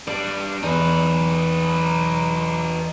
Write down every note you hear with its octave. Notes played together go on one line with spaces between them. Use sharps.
G3 D4 D5
E2 D#4 B4